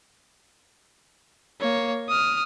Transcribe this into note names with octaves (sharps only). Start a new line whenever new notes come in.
A#3 C#5
D#6 F6